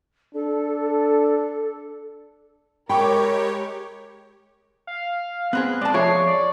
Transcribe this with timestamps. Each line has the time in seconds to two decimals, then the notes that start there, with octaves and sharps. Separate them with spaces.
0.35 D4 A4
2.89 G#3 G4 A#4 C#5 G5 B5 C#6 D6
4.87 F5
5.53 B3 C4 G#4 F#6
5.81 G#3 D5 A5
5.94 F3 G#4 C#5 E5 C7
6.27 D5